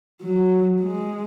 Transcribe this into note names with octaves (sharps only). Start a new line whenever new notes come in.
F#3
G#3